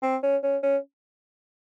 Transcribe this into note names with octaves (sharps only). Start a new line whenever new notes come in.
C4
C#4
C#4
C#4